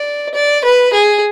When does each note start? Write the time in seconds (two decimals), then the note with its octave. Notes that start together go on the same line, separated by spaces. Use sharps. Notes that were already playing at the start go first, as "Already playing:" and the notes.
Already playing: D5
0.34 D5
0.65 B4
0.93 G#4